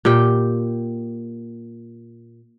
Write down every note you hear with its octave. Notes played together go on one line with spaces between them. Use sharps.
A#2 G4 G5